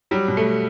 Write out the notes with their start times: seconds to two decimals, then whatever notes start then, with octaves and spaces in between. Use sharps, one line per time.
0.11 F#3 G3
0.28 B2
0.37 A3